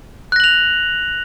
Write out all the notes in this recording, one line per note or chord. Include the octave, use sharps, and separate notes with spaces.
F#6 A#6 F7 F#7